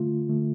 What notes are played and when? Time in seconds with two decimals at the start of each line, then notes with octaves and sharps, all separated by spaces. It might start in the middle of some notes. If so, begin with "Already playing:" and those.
Already playing: D3 A3 F4
0.28 D3 A3